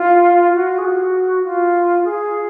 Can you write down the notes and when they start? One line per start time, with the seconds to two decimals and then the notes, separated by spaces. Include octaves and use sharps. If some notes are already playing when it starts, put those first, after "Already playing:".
Already playing: F4
0.54 F#4
0.78 G#4
0.84 F#4
1.44 F4
2.04 G#4